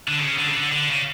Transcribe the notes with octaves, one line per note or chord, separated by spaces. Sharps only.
D3
C#3
D3
C#3
D3
D3
C#3